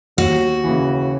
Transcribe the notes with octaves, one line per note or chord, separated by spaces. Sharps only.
D#2 F#4
C#3 E3